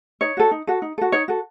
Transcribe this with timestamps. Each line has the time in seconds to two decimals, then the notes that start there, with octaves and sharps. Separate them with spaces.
0.21 D#4 C#5
0.37 F#4 A4
0.51 D#4
0.67 F#4 A4
0.82 D#4
0.98 F#4 A4
1.12 D#4 C#5
1.28 F#4 A4